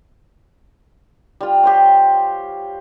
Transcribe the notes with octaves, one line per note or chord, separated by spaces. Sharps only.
G3 F4
G4 C5 C#5